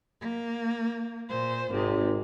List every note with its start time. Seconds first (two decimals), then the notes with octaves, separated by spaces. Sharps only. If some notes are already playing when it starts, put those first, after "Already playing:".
0.20 A#3
1.28 A#2 C5
1.70 G#1 G#2 C3